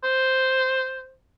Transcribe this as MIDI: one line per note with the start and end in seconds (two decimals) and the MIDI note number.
0.04 1.12 72